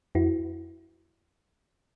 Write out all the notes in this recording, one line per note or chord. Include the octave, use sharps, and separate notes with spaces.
F2 E4 F#4